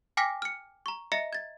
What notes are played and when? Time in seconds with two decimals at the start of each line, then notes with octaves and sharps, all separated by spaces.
0.17 G5 G#5 D6 F6 A#6 B6
0.42 F6 C#7
0.86 A#5 C#6
1.12 D#5 E5 A#5 A#6 C#7
1.33 G#6 A6